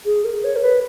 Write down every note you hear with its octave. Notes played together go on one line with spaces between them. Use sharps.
G#4
A#4
C#5
A#4
B4